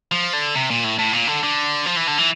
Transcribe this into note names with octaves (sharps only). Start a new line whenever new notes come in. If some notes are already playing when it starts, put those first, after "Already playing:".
F3
D3
C3
A#2
A2
A2
A#2
D3
D3
F3
E3
D3
E3